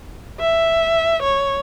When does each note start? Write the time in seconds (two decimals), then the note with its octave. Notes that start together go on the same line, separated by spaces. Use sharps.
0.40 E5
1.23 C#5